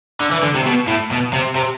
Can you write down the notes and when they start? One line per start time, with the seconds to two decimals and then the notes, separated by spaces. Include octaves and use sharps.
0.20 D3
0.31 E3
0.43 D3
0.55 C3
0.66 B2
0.87 A2
1.11 B2
1.33 C3
1.55 C3